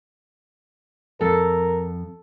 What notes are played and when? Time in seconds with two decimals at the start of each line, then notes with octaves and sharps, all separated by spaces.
1.21 F2 A4 A#4